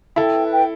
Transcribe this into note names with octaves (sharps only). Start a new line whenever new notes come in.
E4 A4 G5
B4
G5